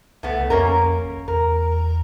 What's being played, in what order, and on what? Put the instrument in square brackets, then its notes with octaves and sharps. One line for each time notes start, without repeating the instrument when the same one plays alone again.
[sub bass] C2 [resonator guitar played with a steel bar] A2 A3 B3
[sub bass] F2 [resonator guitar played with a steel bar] A#3 C#4 A#4
[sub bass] G#1
[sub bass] E2 [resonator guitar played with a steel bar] A#4